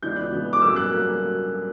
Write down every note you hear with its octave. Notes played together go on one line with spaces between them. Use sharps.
C#2 C#3 E3 B3 D4 G6
F#6
C#2 C#3 E3 B3 D4
D6
G2 F#3 A#3 C#4 E6
F#6
F#3 A#3 C#4